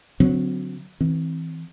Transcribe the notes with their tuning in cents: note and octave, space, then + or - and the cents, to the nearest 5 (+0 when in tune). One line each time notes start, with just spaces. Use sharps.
D3 -40 F#3 -15 C4 -30
E3 -30 C4 +0